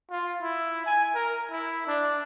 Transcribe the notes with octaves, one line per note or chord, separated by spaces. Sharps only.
F4
E4
G#5
A#4
E4
D4